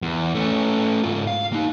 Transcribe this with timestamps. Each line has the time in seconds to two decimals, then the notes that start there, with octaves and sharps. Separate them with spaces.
0.02 E2
0.35 A3 C#4
1.03 G#2 F4
1.27 F5
1.53 A#3 D#4